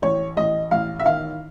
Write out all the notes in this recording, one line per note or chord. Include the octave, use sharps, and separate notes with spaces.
A1 C#5
A1 D#5
A1 F5
E5
D#3 F5